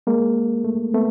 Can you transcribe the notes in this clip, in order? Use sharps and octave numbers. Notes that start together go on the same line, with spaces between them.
G#3 A#3
A3
A3 B3